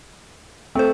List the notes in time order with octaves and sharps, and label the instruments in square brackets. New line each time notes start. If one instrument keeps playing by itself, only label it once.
[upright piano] A3 [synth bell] C4 C5